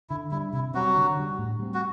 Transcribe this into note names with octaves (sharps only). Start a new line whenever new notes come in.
D3 E4
G3 D4 E4
C3 E4
F#3 G3 C4 F#4
D3
G3 D4
A2
G3 C4
F#4